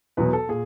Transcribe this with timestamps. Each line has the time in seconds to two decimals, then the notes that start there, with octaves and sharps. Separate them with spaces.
0.17 E2 B2 F#3 B3 B4
0.33 A4
0.49 A#2 G#4